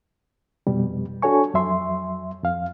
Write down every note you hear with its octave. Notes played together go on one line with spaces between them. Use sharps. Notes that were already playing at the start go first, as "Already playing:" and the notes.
F2 B2 G3
D4 F#4 A4 C#5 G#5 C#6
F2 F#3 E5 C6
F2 F5